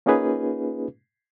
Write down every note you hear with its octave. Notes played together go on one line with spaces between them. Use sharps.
A#3 C#4 D#4 F4 G#4 B4